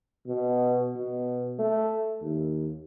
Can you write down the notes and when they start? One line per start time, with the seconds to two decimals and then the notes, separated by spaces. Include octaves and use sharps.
0.27 B2
0.97 B2
1.59 A3
2.22 D#2